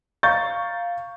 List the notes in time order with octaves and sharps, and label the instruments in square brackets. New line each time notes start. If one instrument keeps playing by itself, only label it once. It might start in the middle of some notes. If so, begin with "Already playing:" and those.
[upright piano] F5 A#5 C#6 G6 A6